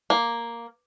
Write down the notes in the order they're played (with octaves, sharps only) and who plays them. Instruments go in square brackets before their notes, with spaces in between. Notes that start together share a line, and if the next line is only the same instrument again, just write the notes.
[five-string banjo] A#3